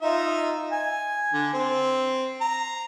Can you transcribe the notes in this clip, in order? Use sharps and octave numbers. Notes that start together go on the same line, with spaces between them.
D#4 F4 E5
G#5
D3
C4
A#5